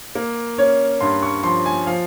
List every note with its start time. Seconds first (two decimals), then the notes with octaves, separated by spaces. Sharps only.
0.15 A#3
0.58 C#4 C#5
1.01 G2 C6
1.23 C#6
1.44 F3 C6
1.66 G#5
1.87 F3 F5